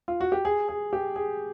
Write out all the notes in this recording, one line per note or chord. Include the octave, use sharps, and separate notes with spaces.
F4
F#4
G4
G#4
G#4
G4
G#4